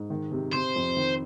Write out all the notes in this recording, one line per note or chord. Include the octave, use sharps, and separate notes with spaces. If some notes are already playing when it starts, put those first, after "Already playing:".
Already playing: G#2
D#3
C3
C3 C5
F2
D#3